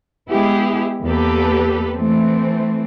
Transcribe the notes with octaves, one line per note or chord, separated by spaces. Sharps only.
G#3 B3 E4 G4 G#4
E2 A#3 G4 A4 B4
E3 A3 C4